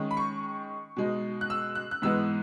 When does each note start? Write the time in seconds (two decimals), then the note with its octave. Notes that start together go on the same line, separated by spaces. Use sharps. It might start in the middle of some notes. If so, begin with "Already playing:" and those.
Already playing: D#3 G#3 C#4
0.11 B5
0.17 C#6
0.97 B2 G#3 D#4
1.41 F#6
1.50 E6
1.75 F#6
1.91 F#6
2.02 G#2 E3 G#3 B3 D#4 E6